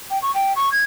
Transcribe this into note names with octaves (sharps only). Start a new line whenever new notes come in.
G5
C#6
G5
C#6
G#6